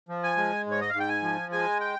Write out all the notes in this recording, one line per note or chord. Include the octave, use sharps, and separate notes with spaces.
F3
G#5
G#3
G#2 C#5
D#5
F5
G#2
G5
G#5
F3
G#3 G#5
G5